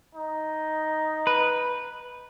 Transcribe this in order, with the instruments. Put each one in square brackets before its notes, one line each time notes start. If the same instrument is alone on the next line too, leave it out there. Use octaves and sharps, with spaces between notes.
[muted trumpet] D#4
[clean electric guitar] B4